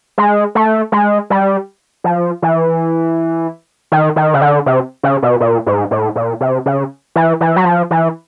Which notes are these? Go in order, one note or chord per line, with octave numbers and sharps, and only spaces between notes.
G#3
A3
G#3
G3
F3
E3
D#3
D#3
C#3
D3
C3
C#3
B2
A#2
G#2
A2
A#2
C3
C#3
E3
E3
F#3
F3
E3